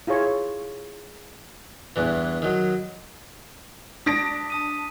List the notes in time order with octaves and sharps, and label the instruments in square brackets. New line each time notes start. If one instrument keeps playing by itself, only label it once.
[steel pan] E4 F4 G#4 C#5
[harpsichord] E2 G2 E3
D#3 F#3
[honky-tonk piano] D4 A#6 D7 [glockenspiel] D#6 B6
[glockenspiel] A5 D#6 D#7